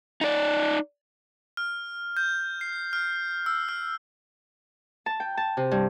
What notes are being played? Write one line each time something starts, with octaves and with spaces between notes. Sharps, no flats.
D#4 D5
F6
G6
C7
F6
E6
F6
A5
G5
A5
C3
G2